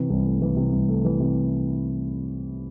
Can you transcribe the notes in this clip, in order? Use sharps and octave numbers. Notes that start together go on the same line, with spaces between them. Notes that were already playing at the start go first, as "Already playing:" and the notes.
Already playing: C3 E3
C2
A3
E3
C3
C2
A3
E3
C3